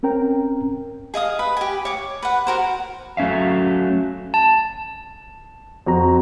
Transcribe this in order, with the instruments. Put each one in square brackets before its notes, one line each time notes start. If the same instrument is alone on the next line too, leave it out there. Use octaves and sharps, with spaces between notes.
[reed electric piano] C4 C#4 A#4 G5 A#5
[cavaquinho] G#4 D#5 F5 D#6
B4
G4 G#5
C#5 D6
B4 F#5
F#4 A#4 C5
[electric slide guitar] F#3 A3 C#4 E5 F5
[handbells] A5
[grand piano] F2 F#4 A#5